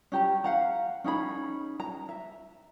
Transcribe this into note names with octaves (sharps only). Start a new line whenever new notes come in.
C#4 G4 A#5
F5 F#5 A#5
C#4 D#4 G#4 B5
A#5
E5